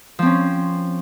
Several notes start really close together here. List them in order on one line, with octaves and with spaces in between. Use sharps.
F3 C4 C#4